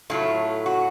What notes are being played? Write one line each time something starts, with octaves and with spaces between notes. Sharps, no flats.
A2 F#3 A3 F4
F#4